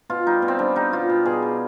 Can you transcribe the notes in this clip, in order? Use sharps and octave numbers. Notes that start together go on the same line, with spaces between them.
B2 F4
G3 D#4
B2
C4
G3 D4
G3 D#4
B2 F4
B2
B2 G#4
G3